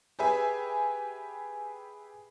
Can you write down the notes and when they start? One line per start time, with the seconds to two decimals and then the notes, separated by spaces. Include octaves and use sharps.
0.19 G4 G#4 B4 E5 G#5